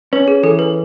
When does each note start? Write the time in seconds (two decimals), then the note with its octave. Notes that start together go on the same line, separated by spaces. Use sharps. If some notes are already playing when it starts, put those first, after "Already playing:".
0.13 C#4 B4
0.28 G#4
0.43 E3 A4
0.59 B4